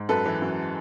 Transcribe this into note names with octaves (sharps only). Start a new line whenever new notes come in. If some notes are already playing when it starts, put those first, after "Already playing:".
Already playing: G#2
F#2 A4 B4
E3
F#2